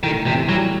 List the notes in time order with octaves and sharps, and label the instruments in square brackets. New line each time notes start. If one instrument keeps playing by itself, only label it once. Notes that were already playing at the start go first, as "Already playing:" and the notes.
[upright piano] A2 [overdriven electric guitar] D#3
[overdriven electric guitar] C3 [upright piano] E3
[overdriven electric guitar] F#3 [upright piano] G3